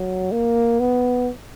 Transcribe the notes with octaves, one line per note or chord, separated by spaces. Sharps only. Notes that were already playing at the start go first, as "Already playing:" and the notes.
Already playing: F#3
A#3
B3